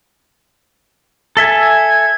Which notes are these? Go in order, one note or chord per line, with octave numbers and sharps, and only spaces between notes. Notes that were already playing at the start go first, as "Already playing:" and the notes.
A4 E5 G#5
G#6